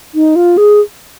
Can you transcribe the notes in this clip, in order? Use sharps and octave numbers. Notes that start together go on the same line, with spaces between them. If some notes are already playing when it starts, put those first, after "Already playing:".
D#4
F4
G#4